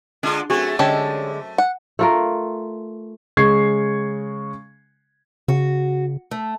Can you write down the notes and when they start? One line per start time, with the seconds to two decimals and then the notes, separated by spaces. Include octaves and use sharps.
0.23 D3 G#3 D4 F4
0.50 F#2 A3 C4 F#4 G#4
0.79 D3 G#3 C#4 G4 A5
1.58 F#5
1.99 A3 F4 A#4
3.37 C#3 G#3 C#6 G#6 C7
5.48 C#3 F#4
6.31 A3